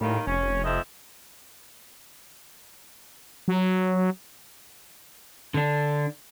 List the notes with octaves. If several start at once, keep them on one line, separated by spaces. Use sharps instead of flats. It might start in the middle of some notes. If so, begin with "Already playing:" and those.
A2 D#3 G3 A#3
F1 C#4
F2 D#5 E5
F#3
D3 D4